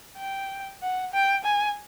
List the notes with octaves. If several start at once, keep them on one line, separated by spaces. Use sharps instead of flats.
G5
F#5
G5
G#5